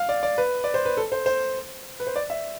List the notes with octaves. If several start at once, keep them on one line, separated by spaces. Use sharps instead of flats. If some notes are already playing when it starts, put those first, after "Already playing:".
Already playing: F5
D5
D5
B4
D5
C5
B4
A4
C5
C5
B4
C5
D5
E5